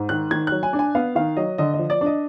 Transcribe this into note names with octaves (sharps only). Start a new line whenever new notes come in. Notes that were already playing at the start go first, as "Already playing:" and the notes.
Already playing: G#2
D#3 F#6
D#3 G#6
F#3 F#6
G#5
D4
G#5
B3 F5
D#3 F5
F#3 D#5
D3 D#5
D#5
F3
D5
D4
D#5